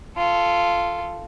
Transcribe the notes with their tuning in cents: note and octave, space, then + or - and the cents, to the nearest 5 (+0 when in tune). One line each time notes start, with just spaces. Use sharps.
F4 -10 A4 +0